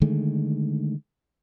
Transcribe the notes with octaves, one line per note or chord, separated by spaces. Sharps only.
D3 D#3 G#3 A3